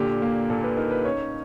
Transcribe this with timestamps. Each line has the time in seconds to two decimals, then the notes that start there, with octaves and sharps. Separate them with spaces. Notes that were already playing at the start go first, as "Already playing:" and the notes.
Already playing: A#2 D3 G4
0.22 A#3
0.49 A#2 A4
0.64 B4
0.77 D#4 A#4
0.91 B4
1.05 C#4 C#5